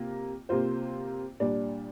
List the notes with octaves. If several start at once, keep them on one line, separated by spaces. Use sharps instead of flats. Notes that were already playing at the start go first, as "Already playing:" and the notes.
Already playing: C3 A#3 F4
C3 A#3 F4 C5
A#2 G3 D4